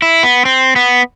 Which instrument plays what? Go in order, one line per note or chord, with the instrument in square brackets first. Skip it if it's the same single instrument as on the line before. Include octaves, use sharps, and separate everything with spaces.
[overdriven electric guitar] E4
B3
C4
B3